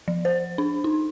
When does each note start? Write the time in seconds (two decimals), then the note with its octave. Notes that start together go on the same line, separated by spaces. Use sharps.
0.08 F3
0.25 C5
0.58 D4
0.84 D#4